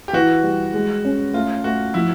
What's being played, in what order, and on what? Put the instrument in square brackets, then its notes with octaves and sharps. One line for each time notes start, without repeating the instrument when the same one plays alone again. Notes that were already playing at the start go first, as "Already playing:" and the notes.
[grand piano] G4
[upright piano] E3 [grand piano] F#4
[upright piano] G3
G#3
C#4
[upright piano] A3 [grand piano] F4
[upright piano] A3 [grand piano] F#4
[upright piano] F3 [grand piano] E4